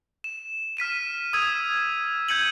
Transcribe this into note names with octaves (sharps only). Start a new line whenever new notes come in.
E7
F6 B6 D#7 E7
D#6 E6 G#6 D#7
G6 G#6 C#7 D#7 F#7